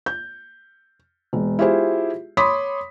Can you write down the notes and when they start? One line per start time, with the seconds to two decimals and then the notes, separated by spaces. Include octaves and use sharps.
0.06 G6
1.33 E1
1.59 E4 F4 G4 G#4 C5
2.37 C#5 B5 C6 D6 D#6 B6